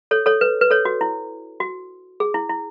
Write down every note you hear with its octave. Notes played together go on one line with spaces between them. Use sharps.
A4 C#5
A4 C#5
B4
B4
A4 C#5
F#4
E4
F#4
G#4
E4
E4